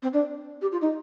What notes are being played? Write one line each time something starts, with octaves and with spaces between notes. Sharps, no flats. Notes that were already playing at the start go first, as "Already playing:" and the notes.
C4
D4
G4
F4
D#4